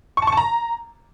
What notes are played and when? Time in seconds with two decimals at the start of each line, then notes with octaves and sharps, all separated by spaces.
0.17 C#6
0.22 A5
0.27 C#6
0.32 A5
0.37 A#5